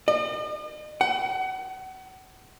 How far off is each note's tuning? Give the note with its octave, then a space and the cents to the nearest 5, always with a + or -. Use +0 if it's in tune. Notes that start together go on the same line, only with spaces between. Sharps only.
D#5 -45
F#5 +30